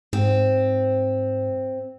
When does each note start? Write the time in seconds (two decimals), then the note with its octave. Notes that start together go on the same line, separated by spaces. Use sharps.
0.13 G#2 C4